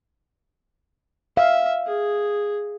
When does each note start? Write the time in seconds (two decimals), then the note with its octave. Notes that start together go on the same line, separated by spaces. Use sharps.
1.37 E5 F5
1.87 G#4